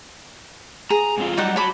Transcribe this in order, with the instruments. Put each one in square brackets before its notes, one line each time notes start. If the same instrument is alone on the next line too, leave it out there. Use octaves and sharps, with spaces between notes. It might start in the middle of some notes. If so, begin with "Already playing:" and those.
[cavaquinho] G#4 [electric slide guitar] A#5
[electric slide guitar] G#2 C4 F4
[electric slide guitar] F#3 G3 [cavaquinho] D#4 D5 F#5
[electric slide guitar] F#4 C#5 [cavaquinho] A5 B5 D6